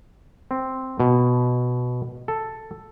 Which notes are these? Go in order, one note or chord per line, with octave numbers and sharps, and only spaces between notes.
C4
B2
A4